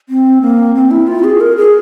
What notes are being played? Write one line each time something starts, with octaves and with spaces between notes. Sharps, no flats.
C4
A#3
C4
E4
F4
G#4
A#4
G#4